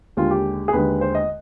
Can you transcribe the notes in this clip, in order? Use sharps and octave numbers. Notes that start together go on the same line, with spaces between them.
D#2 D3 G#3 F4
G4
G#4
D#2 D3 G#3 B4
C5
D#5